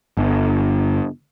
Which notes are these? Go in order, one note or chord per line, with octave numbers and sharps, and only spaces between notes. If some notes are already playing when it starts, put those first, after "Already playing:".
G1